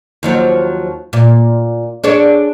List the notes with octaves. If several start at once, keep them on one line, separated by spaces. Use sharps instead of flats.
D#2 F3 F#3
A#2
D4 G#4 C#5